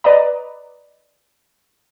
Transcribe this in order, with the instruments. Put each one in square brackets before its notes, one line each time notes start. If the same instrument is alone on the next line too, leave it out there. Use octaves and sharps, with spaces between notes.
[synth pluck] B4 D5 D#5 A#5